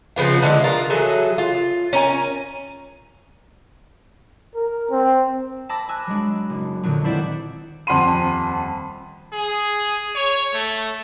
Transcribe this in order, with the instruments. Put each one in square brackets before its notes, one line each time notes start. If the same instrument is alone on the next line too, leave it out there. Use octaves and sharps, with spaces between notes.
[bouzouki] C#3 F3 B3 F4
D3 E3 G#3
F4 A#4
E3 F#3 G#4 A4
F4
C#4 A#4 G#5
[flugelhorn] A#4
C4
[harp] A5 B5 D6 E6 A#6
G#5 E6 F#6
F#3 G#3 D4
F#1
F2 A#2 D3 D#3 F#3
C4 E4 C5 D5 E5 F#5
[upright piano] D#1 F2 F#5 B5 C6 D#7
[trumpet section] G#4
C#5
A3